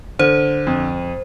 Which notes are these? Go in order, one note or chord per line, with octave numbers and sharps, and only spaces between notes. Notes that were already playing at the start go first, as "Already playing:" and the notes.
D3 C5
F2